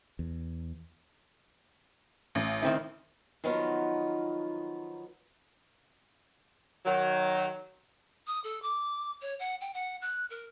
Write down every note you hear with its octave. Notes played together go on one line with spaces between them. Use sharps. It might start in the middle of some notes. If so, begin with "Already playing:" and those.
E2
A1
D#3 C4 E4
D#3 F3 F#3 B3 D#4 F4
D#3 F#3
D#6
A4
D6
C#5
F#5
G5
F#5
F#6
A#4